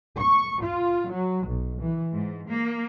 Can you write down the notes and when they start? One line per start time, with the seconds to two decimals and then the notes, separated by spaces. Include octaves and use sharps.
0.18 C#6
0.62 F4
1.11 F#3
1.47 B1
1.82 E3
2.14 G#2
2.48 A#3